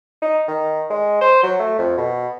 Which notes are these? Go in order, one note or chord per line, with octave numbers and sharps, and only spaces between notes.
D#4
D#3
G#3
C5
F#3
A3
F2
B2